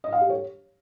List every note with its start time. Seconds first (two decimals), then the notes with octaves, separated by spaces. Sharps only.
0.04 D#5
0.13 F5
0.21 G4
0.30 C#5